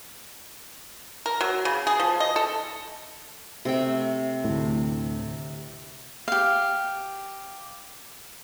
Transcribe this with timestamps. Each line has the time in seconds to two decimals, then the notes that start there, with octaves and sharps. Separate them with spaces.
1.26 A#4
1.41 F#3
1.65 C#3
1.87 G#4
2.00 F3
2.20 D#5
2.36 A4
3.65 C3 A3 G5
4.44 D2 A2
6.28 G4 F5